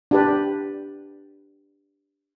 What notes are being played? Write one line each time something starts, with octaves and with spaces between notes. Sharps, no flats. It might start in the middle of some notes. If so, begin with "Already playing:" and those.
D4 G4 B4